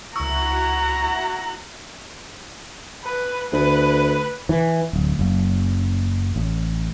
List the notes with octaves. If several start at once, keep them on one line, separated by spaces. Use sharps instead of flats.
C#2 E4 F#4 F#5 A#5 C#6 E6
B4
D2 B4
E3
D1
F#1
A1